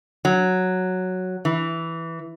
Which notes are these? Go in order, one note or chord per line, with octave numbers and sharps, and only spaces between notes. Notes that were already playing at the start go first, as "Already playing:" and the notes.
F#3
E3